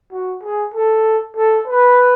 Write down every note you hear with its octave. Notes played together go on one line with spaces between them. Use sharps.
F#4
G#4
A4
A4
B4